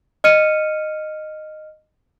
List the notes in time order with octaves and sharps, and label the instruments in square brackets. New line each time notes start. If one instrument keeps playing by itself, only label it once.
[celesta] D#5 F6 C#7 D#7